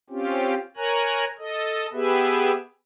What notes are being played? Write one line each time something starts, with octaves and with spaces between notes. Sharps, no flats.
C4 C#4 F4 G4
A#4 C#5 G#5 A#5 F#6
A4 D#5
B3 G4 G#4 B4 E5